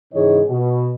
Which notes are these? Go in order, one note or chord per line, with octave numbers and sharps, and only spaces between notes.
G#2 C#3 E3 G#4 C#5 D#5
B2 F#4